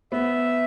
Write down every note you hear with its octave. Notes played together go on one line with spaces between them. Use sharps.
B3 E5